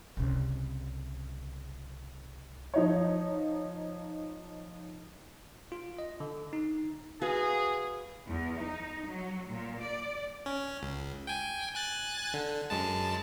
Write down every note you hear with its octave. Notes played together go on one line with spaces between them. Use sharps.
C2 C#3
F3 D#4 C#5
F4
D#5
D3
D#4
F#4 G#4 B4 F5
E2
D#4
F#3
A#2
D5
C#4
C#2
G5 G#5
G#5 F#6 A6
D3
F#2 G#3 A5